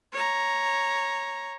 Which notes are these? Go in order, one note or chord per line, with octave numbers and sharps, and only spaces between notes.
C#5 A#5